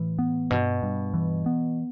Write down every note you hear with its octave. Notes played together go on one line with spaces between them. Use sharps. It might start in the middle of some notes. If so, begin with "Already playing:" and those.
Already playing: A2 E3
B3
G2 B2
G2
E3
B3